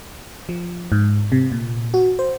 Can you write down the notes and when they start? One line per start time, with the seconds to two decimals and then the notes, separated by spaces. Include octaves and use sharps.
0.49 F3
0.92 G#2
1.32 C3
1.52 A#2
1.94 F#4
2.19 C5